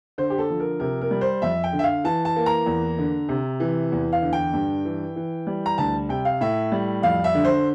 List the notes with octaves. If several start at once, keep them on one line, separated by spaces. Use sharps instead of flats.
D3 C5
G4
A4
F3
A#4
C3 A#4
A#4
G3
C5
F2 E5
G5
D3
E5
F5
E3 A5
A5
A#3
A#5
E2
D3
C3
E3
E2
F5
D3
G5
G2
E3
E3
G3
A#5
D2 A5
C3 G5
F5
A2 E5
G3
F2 F5
E5
D3
C5